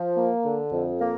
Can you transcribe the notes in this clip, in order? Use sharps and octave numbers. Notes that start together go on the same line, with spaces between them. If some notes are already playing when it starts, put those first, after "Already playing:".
Already playing: F3
A#3
D3
F2
A#3